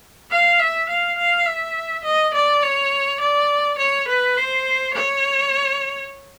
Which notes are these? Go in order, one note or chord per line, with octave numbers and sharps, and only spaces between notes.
F5
E5
F5
F5
E5
D#5
D5
C#5
D5
C#5
B4
C5
C#5